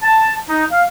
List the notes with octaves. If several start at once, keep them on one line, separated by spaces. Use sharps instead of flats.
A5
D#4
F5